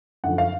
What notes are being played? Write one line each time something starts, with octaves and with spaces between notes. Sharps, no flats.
F#2 D3 F3 F#5
F5